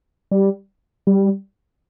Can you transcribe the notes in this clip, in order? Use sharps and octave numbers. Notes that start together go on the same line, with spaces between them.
G3
G3